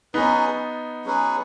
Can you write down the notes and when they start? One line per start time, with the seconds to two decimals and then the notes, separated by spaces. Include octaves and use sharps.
0.14 F#3 B3 C#4 D#4 G#4 B4
1.05 F#3 C#4 G#4 B4